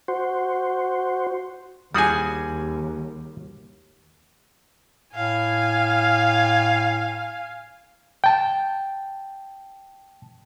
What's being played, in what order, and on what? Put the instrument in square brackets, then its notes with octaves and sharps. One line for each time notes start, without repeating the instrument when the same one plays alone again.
[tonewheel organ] F#4 C5
[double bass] D#2 [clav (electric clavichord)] G3 F#4 G#4 [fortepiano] G#5 D#6
[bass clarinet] A2 [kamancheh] F5 G#5
[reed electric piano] G5 A5